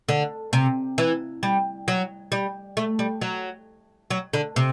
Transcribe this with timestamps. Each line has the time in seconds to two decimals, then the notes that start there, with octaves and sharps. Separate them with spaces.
0.09 D3
0.53 C3
0.98 E3
1.43 G3
1.88 F#3
2.32 G3
2.77 A3
2.99 G3
3.22 F#3
4.10 F#3
4.33 D3
4.56 C3